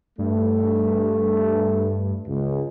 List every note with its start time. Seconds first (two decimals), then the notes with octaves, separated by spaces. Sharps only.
0.19 G2 A3
2.28 C#2